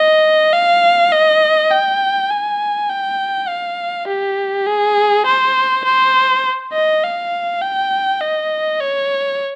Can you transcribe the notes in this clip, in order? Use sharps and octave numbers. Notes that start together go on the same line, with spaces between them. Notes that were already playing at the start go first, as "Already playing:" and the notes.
Already playing: D#5
F5
D#5
G5
G#5
G5
F5
G4
G#4
C5
C5
D#5
F5
G5
D#5
C#5